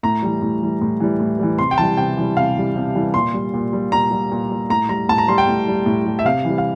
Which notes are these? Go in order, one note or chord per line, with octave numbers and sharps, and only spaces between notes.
A2 A#5
E3 G3
A2
E3 G3
A2
E3 G3
A2
E3 G3
C3 C6
G5
E3 G3 A5
C3 G5
E3 G3
C3 F5
E3 G3
C3
E3 G3
A#2 C6
G3
A#2
G3
A#2 A#5
G3
A#2
G3
A2 A#5
G3 A#5
A2 A5
A#5
G3 C6
G5
A2
G3
A2
G3
E5
C3 F5
E3 G3
F5